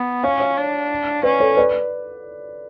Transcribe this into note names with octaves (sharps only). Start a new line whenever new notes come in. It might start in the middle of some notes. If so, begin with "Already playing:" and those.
Already playing: B3
C#4 C#5 F5
C#5 F5
D4
C#4 B4 D5
A4 C#5
B4 D5